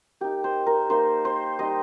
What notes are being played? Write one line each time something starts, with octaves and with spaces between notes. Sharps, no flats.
A#3 D#4 G4
C5
A#4
A#3 D#4 C5
C5
G3 D#4 D#5